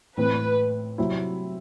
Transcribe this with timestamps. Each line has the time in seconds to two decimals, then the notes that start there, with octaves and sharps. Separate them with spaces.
0.17 A2 E3 A3 C4 B4
0.98 C3 F#3 C4 E4